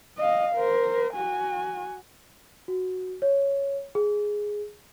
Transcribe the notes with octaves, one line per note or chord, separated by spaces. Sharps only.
D#5 F5
A#4 C5
F#4 G#5
F#4
C#5
G#4